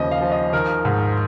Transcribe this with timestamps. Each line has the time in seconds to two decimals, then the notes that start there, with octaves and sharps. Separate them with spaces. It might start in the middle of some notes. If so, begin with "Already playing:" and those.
Already playing: D#2 C#3 F3 D#5
0.11 F5
0.21 F3
0.32 D#5
0.53 D#3 A#4
0.85 G#2